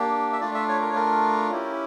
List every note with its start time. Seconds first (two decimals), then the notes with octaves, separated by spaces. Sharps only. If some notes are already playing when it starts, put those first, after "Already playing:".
Already playing: A#3 D4 G4
0.33 E5
0.41 A3 D4 F4 D5
0.54 E5
0.69 C#5
0.82 A#4
0.89 C#5
0.96 A#4
1.50 C#4 E4 G4